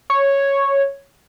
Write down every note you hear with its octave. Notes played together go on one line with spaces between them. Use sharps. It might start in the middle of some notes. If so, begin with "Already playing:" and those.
C#5